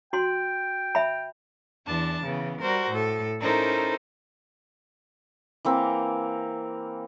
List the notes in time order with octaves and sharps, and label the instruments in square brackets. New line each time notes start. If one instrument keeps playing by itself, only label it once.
[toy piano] F#4 C6 [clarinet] G5
[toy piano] E5 B5
[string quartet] E2 E3 D4 A5
C#3 E3 B3
G3 F#4 A#4 C5
A2 A4
C#4 D#4 E4 A4 A#4 C5
[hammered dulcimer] E3 A#3 C4 A#4